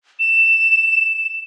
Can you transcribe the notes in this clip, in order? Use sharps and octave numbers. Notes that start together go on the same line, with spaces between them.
E7